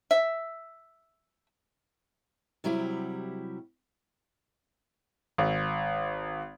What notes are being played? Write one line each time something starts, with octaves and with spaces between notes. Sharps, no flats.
E5
C3 F#3 G3 E4 G4
G#1